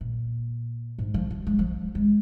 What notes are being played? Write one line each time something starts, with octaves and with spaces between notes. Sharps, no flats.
A#2
G#2
F3
F3
G#3
F3
G#3